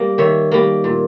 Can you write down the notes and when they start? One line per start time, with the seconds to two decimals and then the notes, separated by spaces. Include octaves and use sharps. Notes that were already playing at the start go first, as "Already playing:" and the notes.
Already playing: G3 A#3
0.18 D#3 C#5 E5
0.52 G3 A#3
0.84 A#2